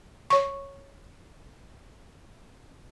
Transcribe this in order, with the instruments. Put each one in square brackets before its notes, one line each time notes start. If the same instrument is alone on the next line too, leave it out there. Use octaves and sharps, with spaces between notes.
[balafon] C#5 C#6